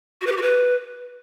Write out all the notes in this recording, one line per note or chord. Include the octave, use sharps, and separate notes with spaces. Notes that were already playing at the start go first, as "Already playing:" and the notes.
F#4
B4
G4
F#4
B4